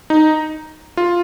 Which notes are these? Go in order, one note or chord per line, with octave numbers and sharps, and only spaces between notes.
D#4
F4